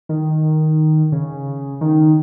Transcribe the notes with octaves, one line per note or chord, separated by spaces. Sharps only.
D#3
C#3
D#3